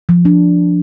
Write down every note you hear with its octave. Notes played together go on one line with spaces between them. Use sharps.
F3
D4